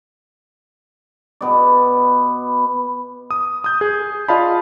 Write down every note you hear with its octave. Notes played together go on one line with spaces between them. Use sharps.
B2 B3 D5
D#6
D#6 G6
G#4
F4 D5 D#5 F5 A5 B5